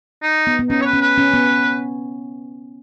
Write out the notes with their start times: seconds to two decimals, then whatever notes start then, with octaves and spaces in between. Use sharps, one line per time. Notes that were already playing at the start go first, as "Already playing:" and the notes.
0.23 D#4
0.47 B3
0.59 B3
0.70 C#4 D#4
0.81 C#5
0.86 B4
0.93 C#4
1.01 B4
1.18 C#4
1.34 B3